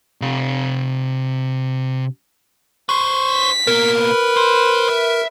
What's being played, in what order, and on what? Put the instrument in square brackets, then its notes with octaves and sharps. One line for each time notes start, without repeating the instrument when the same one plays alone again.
[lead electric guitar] C3 F5
[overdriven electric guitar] B4 C5 [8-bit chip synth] C#6
[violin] B6
[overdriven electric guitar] B2 A#3 [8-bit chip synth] A#4
[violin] B4
[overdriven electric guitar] C5
E5